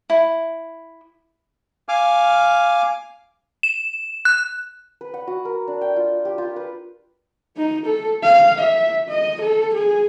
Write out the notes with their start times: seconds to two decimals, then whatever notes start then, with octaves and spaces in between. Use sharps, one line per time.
0.10 E4
1.89 F5 G#5 D6 F6
3.63 E7
4.25 F#6
5.01 B4
5.14 F#5
5.27 F#4
5.45 A#4
5.68 D4
5.81 G5
5.96 F4
6.25 G4
6.38 F4
6.56 B4
7.57 D#4
7.86 A4
8.23 F5
8.59 E5
9.09 D#5
9.42 A4
9.75 G#4